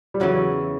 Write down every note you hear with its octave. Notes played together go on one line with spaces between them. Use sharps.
G3
E2 C#3 E3 F#3